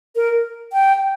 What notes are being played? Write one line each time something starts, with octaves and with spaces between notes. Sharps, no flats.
A#4
G5